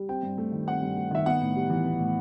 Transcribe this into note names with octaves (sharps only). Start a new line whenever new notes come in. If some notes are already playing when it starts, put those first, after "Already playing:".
Already playing: G3
C4 G5
G2
A3
D#3
C4 F#5
G2
A3
D#3 E5
B3 F#5
A2
G3
E3
B3
A2